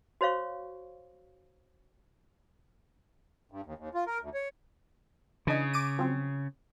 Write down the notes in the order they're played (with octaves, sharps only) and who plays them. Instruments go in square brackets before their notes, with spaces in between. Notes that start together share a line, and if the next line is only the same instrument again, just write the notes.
[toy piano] F#4 C5 C#5 F5 C#6
[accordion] G2
D#2
D#2
F4
A#4
D2
C#5
[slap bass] C#3 [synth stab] E3 D4 D#5
[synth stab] D6 D7 D#7
F3 F#3 C4